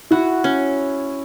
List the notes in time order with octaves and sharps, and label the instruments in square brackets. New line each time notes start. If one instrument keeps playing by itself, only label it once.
[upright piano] E4 [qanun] F#4
[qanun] C#4